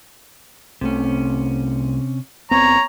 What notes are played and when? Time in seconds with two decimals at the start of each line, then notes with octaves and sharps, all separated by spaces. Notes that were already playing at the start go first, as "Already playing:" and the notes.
0.81 C2 C3 A3 C#4
2.51 F#1 B3 C4 C#5 A#5